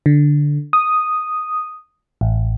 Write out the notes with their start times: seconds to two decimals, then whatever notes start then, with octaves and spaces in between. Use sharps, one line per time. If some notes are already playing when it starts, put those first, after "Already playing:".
0.06 D3
0.73 D#6
2.21 A1